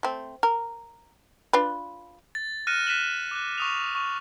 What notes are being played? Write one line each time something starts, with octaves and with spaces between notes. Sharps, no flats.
A3 C4
A#4
D4 F4 B4
A6
F6 F#6 A#6 C#7 D#7 E7
F#6 B6 D#7 E7 F#7
D6 F#6
C#6 D#6 F7
C#6